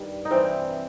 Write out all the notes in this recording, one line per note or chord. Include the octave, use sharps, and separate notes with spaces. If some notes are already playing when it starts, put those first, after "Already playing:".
Already playing: G2 D#3 G3
D#4
C3 E3 G3 C4